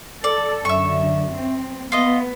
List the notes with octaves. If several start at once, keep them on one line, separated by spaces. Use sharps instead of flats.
A4 D5
F#2 D3 E5 C#6
C4
B3 F4 D#5